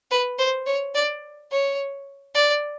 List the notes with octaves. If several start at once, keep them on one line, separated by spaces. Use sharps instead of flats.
B4
C5
C#5
D5
C#5
D5